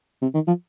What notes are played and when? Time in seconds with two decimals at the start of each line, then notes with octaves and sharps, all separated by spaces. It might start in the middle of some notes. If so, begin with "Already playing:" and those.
0.22 C3
0.35 D#3
0.48 F3